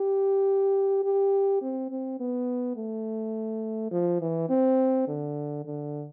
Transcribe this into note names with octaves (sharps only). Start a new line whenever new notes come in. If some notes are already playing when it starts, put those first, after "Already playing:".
Already playing: G4
G4
C4
C4
B3
A3
F3
E3
C4
D3
D3